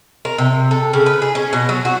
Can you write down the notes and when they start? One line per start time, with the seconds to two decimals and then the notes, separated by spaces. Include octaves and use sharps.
0.25 A#4
0.38 C3
0.71 A4
0.93 C#3
1.06 B4
1.22 G#4
1.35 C#4
1.53 B2
1.69 F#3
1.85 F#4